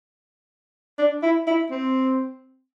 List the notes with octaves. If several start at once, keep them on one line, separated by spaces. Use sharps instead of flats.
D4
E4
E4
C4